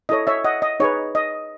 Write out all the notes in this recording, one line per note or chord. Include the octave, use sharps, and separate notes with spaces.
E4 A4 C#5 D#5
C#5 E5
D#5 F#5
D#5
D#4 G#4 B4 C#5
D#5